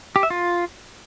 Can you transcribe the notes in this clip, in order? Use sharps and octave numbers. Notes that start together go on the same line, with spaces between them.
G4
E5
F4